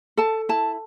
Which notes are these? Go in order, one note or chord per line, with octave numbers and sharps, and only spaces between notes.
A4 A5
E4 A5